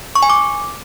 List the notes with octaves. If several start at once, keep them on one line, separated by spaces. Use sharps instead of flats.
C#6
G#5
D6